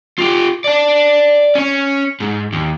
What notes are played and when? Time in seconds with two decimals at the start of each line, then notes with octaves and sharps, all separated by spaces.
0.18 F4 G4
0.64 D5 A5
1.55 C#4 C#5
2.20 G#2
2.53 D#2